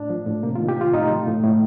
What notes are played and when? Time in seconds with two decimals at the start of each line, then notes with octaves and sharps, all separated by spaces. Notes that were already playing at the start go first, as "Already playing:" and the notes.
Already playing: A2 D4
0.10 F3
0.26 A2
0.43 C3 A#3
0.55 F4
0.60 D#3
0.69 G4
0.77 C3 F4
0.94 A2 D#4
1.10 F3
1.27 A2
1.44 A2